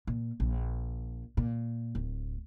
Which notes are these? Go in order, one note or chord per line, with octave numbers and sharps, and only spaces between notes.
A#2
A#1
A#2
D1